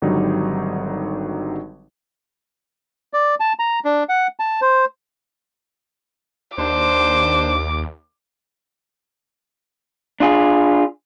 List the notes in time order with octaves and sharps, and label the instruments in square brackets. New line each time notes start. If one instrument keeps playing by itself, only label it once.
[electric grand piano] G#1 D3 F#3 G3 D#4
[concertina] D5
A5
A#5
D4
F#5
A5
C5
[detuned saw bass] D#2 [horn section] D4 C5 [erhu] D6
[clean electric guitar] D4 F4 G#4